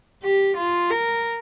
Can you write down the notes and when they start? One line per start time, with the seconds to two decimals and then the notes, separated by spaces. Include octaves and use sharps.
0.24 G4
0.57 F4
0.91 A#4